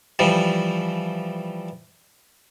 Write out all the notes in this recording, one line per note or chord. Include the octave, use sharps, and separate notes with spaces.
E3 F3 G3